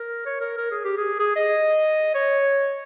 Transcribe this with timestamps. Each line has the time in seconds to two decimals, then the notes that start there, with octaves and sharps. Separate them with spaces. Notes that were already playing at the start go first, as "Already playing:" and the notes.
Already playing: A#4
0.26 C#5
0.41 A#4
0.57 A#4
0.71 G#4
0.84 G4
0.97 G#4
1.19 G#4
1.36 D#5
2.15 C#5